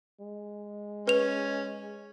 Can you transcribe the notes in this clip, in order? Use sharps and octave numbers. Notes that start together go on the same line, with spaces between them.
G#3
C#4 B4 F7